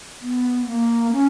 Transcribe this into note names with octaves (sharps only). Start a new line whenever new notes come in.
B3
A#3
C#4